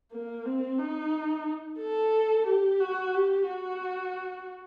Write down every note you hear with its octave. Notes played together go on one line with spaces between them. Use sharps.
A#3
C4
D#4
A4
G4
F#4
G4
F#4